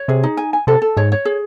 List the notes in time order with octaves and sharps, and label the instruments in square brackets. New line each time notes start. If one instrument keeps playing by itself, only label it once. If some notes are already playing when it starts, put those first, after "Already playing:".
Already playing: [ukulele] C#5
[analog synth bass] C3 [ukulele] G#4
[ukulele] D#4
G#5
G#5
[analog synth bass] C3 [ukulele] A4
[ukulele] A4
[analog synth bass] G#2 [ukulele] C#5
[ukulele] C#5
G#4